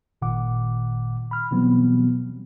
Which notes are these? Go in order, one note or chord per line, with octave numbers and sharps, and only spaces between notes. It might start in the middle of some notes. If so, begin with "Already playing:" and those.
G#1 A#2 D#3 F#5 D6
B5 F6
B2 E3 F#3 G3 B3 C4